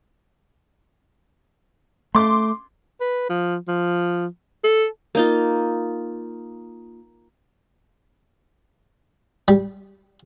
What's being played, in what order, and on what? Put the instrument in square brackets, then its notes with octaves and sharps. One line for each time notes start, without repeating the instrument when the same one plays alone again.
[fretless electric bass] A3 [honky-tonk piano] C6 D6
[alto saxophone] B4
F3
F3
A4
[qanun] A#3 D#4 F4
[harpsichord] G3